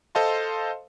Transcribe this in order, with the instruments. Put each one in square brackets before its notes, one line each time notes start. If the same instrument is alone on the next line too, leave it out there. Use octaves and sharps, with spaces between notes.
[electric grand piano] A4 C5 D#5 F5 A5 C6